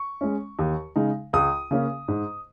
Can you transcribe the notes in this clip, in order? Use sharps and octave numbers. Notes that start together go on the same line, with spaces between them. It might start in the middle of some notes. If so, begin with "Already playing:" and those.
Already playing: C#6
G#3 C#4
D#2
C#3 G#3 D#4
C#2 D#6
C#3 A#3 C#4
G#2